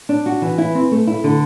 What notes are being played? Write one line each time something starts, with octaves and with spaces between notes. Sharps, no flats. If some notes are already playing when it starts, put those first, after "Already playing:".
D4
F#4
E3
E4
C4
A3
E4
D3